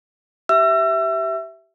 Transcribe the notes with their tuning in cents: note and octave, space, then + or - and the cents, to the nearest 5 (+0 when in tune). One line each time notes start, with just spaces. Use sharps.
G4 -25 E5 +0 E6 +35